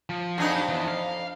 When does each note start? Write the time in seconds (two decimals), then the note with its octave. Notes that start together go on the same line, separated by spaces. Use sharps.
0.09 F3
0.38 F2 D4 D#4 F#4 G#4
0.69 E3 B3
0.88 F5